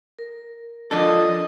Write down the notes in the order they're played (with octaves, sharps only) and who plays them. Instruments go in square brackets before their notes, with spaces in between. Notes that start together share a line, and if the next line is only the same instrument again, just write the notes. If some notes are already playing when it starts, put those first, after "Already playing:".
[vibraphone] A#4
[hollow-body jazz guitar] F3 D4 A4 [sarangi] D#5